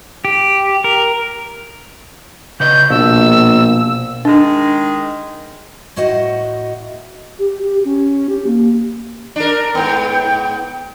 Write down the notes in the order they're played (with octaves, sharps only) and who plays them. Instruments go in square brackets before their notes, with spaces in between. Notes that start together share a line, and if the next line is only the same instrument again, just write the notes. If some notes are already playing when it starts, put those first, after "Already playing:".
[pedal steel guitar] G4
A#4
[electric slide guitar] C#3 B4 D#5 [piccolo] G6
[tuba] A#1 [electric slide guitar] B2 [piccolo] E6
[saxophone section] D#3 G#3 [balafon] D4
[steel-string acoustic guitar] A2 F#4 C5 D#5 F#5
[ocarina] G4
G4
C#4
G4
A#3
[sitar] D4 A#4
[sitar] G#2 B3 [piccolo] G5